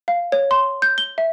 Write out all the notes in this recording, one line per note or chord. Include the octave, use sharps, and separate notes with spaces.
F5
C#5
C6
G6
G7
E5